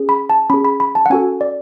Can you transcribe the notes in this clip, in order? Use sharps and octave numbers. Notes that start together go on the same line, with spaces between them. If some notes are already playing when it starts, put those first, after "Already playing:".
Already playing: C#4 G#4
B5
A5
C#4 G#4 B5
B5
B5
A5
F#5
C#4 F#4 A4 G#5
D5